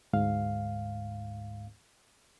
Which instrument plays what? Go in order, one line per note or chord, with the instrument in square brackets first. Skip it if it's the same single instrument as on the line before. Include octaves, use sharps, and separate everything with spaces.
[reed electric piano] D2 G#2 F5